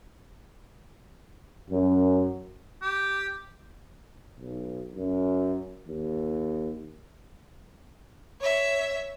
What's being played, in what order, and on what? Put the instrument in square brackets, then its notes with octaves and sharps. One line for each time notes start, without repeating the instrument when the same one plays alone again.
[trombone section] F#2
[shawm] G4
[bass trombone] B1
F#2
D#2
[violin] C#5 E5